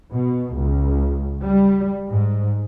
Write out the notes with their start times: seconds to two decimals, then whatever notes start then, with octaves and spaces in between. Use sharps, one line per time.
0.13 B2
0.57 C#2
1.43 G3
2.09 G#2